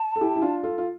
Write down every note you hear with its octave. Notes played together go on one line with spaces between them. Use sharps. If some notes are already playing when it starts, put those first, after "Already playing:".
Already playing: A5
A4
E4 G4
E4
D4 F4
F4 A4
F4